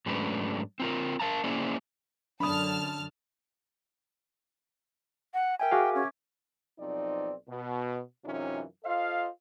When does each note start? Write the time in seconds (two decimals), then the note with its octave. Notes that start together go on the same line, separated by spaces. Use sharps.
0.06 G#2 F#3 A3 C#4 D4 B4
0.80 C4 F4 A#4
1.20 A#4 F5 A5 A#5
1.44 A#3 C#4 E4 G#4 C5 D5
2.40 F#2 D3 D4 A5 B5 D#6 F6
5.34 F#5
5.60 A#4 E5 G5 G#5
5.71 F#4 G#4 E5 F5 D6
5.95 C#4
6.79 B1 F3 C4 D#4 D5
7.49 B2
8.25 F#2 C3 E3 C#4 D#4 F4
8.84 F4 A4 C5 D#5 F5